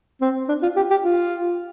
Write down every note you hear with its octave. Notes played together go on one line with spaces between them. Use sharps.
C4
D4
F4
G4
G4
F4